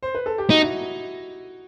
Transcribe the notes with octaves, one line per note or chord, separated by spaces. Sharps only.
C5
B4
A4
G4
D#4 F#4
E4